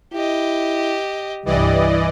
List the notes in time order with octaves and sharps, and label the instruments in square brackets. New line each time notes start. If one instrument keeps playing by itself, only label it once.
[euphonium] E4 [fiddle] G4 D#5
[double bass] C2 G2 [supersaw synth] E3 D5 D#5 [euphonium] G3